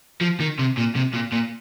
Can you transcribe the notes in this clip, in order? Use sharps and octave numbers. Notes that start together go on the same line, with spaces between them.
F3
D#3
C3
A#2
C3
A#2
A#2